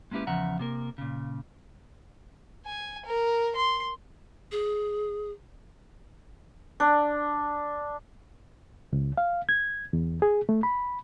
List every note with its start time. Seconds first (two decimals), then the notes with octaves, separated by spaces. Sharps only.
0.11 G#3 A#3 C#4 E4 G4 B4
0.27 E2 C#3 F3 E5 F#5 A#5
0.59 C3 A#3 A#4
0.98 A#2 C#3
2.66 G#5
3.06 A#4
3.56 C6
4.52 G#4
6.80 D4
8.93 C#2
9.17 F5
9.49 G#6
9.93 E2
10.22 G#4
10.49 A3
10.63 B5